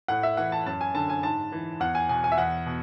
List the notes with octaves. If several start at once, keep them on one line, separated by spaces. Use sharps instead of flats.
A2 F#5
E5
E3 F#5
A5
F#2 A5
G#5
D3 A5
G#5
G#2 A5
E3
E2 F#5
G#5
B2 G#5
G#5
E5
E2 F#5
B2